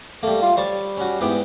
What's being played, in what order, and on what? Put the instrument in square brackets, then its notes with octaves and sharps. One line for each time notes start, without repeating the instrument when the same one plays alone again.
[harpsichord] G3 A#3 [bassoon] A3
[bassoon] F4
[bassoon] G3 [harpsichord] C5 C#5 A5
[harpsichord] C#4 F#4
[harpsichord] G#2 B3 G4 [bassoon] E3